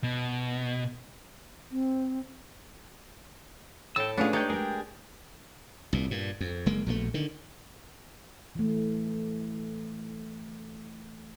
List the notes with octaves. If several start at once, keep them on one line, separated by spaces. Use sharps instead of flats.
B2
C4
A2 G5 A5 E6
A3 B3 C#4 D4 F4 G#4 B4
D4 D#4 G4 C#5 D5 G6
G#3 G#4 A#4 G5
C2 A#2
G2 A#2
F2
F#1 G#3 A#3
A#1 B2 E3 A3
D3 D#3
E3 A3